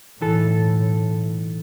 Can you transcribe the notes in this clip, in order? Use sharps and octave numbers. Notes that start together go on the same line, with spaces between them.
B1 A2 E3 A4